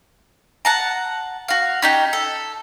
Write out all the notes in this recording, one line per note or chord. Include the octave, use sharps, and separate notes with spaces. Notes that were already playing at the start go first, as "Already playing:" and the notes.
F#5 A5 A#5
F#4 F5
C#4 D#4 G4
A4